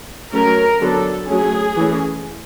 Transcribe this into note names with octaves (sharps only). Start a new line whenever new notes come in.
F#3 A3 C#4 A#4
D3 F#3 B3 D4 A4
F#3 A3 C#4 G#4
E3 A3 C#4